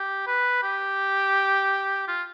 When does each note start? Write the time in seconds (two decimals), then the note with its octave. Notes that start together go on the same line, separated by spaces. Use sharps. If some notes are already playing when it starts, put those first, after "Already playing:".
Already playing: G4
0.27 B4
0.63 G4
2.08 F4